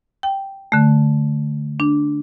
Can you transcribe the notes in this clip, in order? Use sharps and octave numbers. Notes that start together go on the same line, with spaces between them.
G5
D3 A3
D4